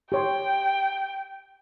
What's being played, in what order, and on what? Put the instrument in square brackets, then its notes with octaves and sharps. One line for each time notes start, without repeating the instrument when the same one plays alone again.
[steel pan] G4 C#5 C6 [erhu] G5